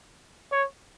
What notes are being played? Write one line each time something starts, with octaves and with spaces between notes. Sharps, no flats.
C#5